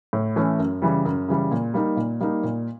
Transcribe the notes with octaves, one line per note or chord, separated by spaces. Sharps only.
A2
E3 A3 C#4
F#2
C#3 E3 G3
F#2
C#3 E3 G3
A#2
G3 A#3 D#4
A#2
G3 A#3 D#4
A#2